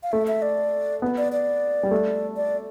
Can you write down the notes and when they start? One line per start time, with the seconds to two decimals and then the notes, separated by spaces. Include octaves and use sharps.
0.03 F5
0.12 A3 E5
0.27 E5
0.42 D5
1.02 B3
1.17 D5
1.32 D5
1.83 G3
1.91 A3
2.37 D5